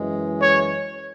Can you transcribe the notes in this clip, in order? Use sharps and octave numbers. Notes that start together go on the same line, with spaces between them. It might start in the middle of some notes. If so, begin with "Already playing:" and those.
Already playing: F#2 E3 G#3
C#5